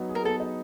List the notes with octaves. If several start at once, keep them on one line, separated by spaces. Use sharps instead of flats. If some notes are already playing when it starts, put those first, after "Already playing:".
Already playing: F#3 B3 D#4
G#4
A#4
B3 A4
D#4